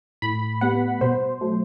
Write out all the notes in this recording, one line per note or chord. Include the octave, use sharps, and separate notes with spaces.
A2 B5
G3 B3 F#5
B2 C5
F#3 A3